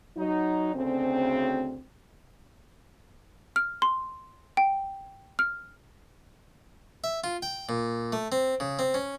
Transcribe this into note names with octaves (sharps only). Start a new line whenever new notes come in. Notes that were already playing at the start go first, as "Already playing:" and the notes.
F#3 D#4
D2 C#3 C4
F6
C6
G5
F6
E5
F4
G5
A#2
A3
C4
C#3
C4
C#4